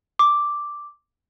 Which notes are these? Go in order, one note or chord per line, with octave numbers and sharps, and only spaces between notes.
D6